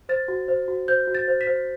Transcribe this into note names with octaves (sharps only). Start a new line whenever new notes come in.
C5 A6
F#4
C5
F#4
C5 G6
F#4
A6
C5
B6
C5